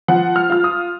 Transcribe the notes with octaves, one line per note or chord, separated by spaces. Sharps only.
F3 F#5
F6
F4 F6
D#6